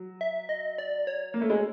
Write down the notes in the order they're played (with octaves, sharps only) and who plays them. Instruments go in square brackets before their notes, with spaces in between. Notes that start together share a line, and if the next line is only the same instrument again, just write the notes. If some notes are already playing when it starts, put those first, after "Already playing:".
Already playing: [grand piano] F#3
[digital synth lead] E5
D#5
D5
C#5
[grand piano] A#3
A3
G#3